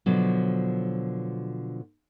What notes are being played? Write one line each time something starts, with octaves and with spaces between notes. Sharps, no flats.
B2 D3 F3 F#3